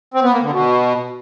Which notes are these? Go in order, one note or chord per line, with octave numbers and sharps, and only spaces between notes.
C4
B3
A#3
D3
B2